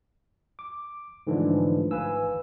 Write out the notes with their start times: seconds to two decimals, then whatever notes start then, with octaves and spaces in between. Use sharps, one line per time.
0.59 D6
1.27 G#2 D3 E3 F3 A3 D4
1.91 G#1 B4 F5 G#5 E6